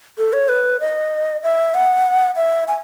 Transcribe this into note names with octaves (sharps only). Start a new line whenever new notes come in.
A4
C#5
B4
D#5
E5
F#5
E5
G#5